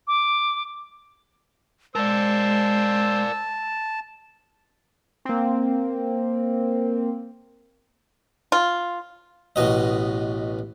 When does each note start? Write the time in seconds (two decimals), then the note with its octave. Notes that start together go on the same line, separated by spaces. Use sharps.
0.08 D6
1.95 G#3 A#4 C5 D5 A5 E6
5.25 A#3 C4
8.52 F4
9.56 A1 B2 D#5